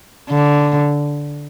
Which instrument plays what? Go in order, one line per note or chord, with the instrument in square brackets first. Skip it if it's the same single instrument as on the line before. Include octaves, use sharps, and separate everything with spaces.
[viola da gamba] D3